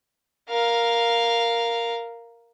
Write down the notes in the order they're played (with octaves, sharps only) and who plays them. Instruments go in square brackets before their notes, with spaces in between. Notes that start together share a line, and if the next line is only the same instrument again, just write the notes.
[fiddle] A#4 F5